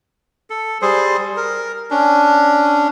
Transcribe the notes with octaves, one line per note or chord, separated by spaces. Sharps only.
A4
G3 G#4 C5
A#4
C#4 D4